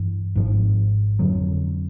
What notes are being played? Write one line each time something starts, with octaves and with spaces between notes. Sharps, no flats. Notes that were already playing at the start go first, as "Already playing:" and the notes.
Already playing: G2 E3
G#1 G#2 F3
F2 D3 F#3